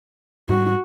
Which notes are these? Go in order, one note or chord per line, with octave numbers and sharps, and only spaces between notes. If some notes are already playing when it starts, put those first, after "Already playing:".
G#2 G3 F#4